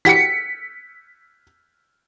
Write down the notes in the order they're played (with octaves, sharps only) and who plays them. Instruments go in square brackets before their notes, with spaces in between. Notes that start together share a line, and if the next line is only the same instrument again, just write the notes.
[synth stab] E3 F#4 G4 [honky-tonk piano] B6 C#7